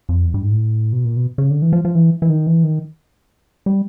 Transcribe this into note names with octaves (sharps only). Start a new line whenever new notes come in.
F2
E2
G2
G#2
A2
B2
A#2
B2
C#3
D3
E3
F3
F3
E3
E3
D#3
E3
D#3
G3